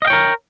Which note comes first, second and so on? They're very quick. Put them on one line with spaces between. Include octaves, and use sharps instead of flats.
D#5 F5 G5 C#5 A#4